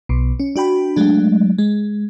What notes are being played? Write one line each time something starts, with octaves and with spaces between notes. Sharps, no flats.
B1 B2
C#4
D4 F#4 G5 B5
F#3 G#3 A3 D4
G#3